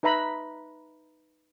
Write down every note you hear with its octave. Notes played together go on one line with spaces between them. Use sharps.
D#4 B4 E5 A#5 B5